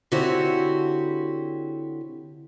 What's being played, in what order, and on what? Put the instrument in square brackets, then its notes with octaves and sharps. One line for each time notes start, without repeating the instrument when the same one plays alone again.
[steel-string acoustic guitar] D3 C4 E4 F#4 G4 C#5